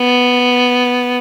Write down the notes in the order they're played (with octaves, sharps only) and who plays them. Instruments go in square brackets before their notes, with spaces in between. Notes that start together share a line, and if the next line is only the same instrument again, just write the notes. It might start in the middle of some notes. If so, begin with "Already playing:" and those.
Already playing: [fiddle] B3